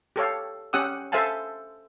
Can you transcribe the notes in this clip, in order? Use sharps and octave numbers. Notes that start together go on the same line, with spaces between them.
G4 A4 C#5 F5
C#4 G4 F#5 D#6 E6
A4 C5 E5 F5 G#5 A5